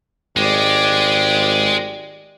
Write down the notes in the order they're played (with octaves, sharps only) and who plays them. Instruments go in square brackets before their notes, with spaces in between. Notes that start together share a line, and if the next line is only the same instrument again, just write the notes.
[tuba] G#1 [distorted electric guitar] G#3 [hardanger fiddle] G4 D5